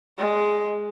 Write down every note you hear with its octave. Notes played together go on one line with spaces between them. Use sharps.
G#3